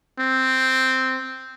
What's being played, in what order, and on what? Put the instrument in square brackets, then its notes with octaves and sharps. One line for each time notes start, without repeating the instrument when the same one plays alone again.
[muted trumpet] C4